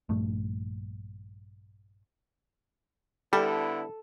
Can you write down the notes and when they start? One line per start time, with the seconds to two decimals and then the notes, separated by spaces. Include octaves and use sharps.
0.09 A#1 G2 A3
3.33 D3 G3 B3 E4 A4